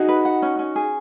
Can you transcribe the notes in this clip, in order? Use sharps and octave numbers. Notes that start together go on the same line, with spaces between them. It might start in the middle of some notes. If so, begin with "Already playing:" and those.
Already playing: D#4 F#4 G#4
B4
F#5
C#4
C#4
G#4